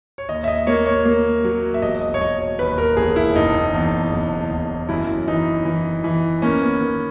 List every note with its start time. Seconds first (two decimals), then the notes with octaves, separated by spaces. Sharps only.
0.18 C#5
0.29 D#2 D#5
0.44 E5
0.48 D#5
0.67 A#3 C#5
0.86 C#5
1.05 A#3
1.44 F#3
1.74 E5
1.82 E1 D#5
2.01 D#5
2.14 C#5
2.21 F#3 D#5
2.40 C#5
2.59 D#2 B4
2.78 A#4
2.97 E1 G#4
3.16 E4
3.36 F#1 D#4
3.74 E2
4.12 F#1
4.51 E2
4.89 F#2 E4
5.28 E3 D#4
5.65 E3
6.04 E3
6.42 A#3 C#4
6.61 B3
6.80 D#3 B3